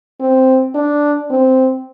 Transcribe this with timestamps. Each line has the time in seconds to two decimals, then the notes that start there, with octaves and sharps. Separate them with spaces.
0.20 C4
0.75 D4
1.30 C4